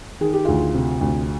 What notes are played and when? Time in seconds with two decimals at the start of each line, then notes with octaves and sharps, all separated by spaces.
0.21 D#3 G#4
0.33 G4
0.44 D2 F4 G#4
0.74 C3
1.01 D2